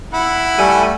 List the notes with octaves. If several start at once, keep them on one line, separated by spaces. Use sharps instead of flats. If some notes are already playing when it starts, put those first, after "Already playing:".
E4 F#5
G3 A3 G#5